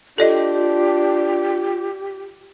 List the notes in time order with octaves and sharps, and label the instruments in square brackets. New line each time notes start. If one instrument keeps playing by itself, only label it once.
[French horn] D4 [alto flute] F4 [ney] G4 [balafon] A4 D5 D#5